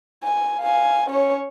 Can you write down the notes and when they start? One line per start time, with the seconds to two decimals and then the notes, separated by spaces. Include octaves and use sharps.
0.23 G#5
0.60 F5 G#5
1.09 C#4 C#5